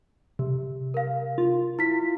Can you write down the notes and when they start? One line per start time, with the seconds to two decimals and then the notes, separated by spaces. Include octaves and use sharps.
0.39 C3
0.94 A#4 F5
1.38 F4
1.79 E4 B6